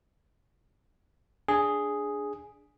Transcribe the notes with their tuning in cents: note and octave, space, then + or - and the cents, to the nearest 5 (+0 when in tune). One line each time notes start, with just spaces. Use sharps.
D4 +0 G#4 +0